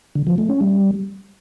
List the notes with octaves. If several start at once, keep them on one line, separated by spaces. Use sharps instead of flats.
D3
F3
A3
C#4
G3